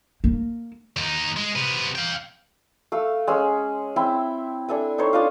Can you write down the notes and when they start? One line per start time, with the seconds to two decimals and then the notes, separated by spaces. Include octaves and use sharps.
0.24 A#3
0.97 D#2 D#4
1.37 G#3
1.56 C3 B3
1.95 F5 G5
2.92 A3 F5 E6
3.27 G#3 C#4 E6
3.96 C4 E4 E5 G5
4.69 D4 A4 E5 G#5
4.98 D#4 A4 C5 C#5
5.13 D4 F4 D#5 F5